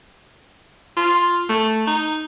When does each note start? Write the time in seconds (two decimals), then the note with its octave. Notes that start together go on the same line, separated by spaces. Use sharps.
0.97 F4
1.49 A3
1.87 D#4